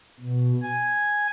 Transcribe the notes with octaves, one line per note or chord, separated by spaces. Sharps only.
B2
G#5